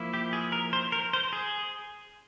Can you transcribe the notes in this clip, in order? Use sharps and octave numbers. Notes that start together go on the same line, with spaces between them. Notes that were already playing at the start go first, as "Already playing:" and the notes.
Already playing: F3 A#3 E4
G4
G#4
A#4
C5
A#4
C5
G#4